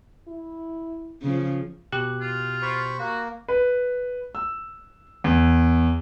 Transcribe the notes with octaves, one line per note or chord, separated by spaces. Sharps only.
E4
C#3 F3
B2 G4 F#6
F4
C5 B5 C#6
A#3 F#4
B4
E6
E2